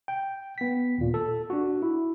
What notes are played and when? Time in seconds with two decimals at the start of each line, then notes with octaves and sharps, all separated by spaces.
0.08 G5
0.58 B3 B6
0.98 D#2 A#2
1.14 A4
1.50 D4 F#4
1.82 E4